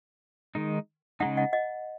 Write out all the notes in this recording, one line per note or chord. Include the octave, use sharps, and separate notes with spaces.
D#3 G#3 D#4
C#3 G#3 D#4 F#5 A#5
D#5 F#5
D#5 F#5